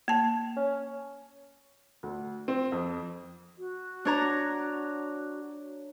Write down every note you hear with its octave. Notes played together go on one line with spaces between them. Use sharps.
A#3 A5
C#4
D2
C4
F2
F#4
D4 C#5 A#5